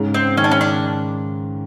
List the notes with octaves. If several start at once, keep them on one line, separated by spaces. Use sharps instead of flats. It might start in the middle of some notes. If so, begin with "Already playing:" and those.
Already playing: G#2 C#3
C4
D#3 C#4
D4
C#4
D4